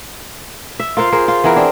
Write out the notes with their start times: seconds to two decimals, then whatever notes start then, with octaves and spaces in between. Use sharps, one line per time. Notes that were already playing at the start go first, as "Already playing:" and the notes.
0.80 E5
0.97 F4 A#4 C5 F5
1.12 G#4 A#4 C5
1.28 F4
1.44 E3 B3 G#4 A#4
1.56 C4 D4